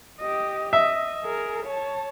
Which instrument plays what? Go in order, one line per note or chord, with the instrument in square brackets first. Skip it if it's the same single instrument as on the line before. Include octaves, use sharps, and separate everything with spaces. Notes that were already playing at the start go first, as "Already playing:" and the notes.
[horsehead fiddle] G4 D#5
[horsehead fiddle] D#5 [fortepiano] E5
[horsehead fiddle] G#4 A#4
C#5 A5